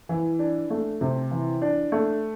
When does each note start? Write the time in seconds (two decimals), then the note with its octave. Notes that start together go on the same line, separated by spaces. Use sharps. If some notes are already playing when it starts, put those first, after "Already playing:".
0.09 E3
0.39 D4
0.70 A3
1.01 C3
1.31 E3
1.62 D4
1.92 A3